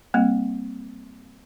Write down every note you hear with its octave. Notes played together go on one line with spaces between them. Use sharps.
G3 A#3 C4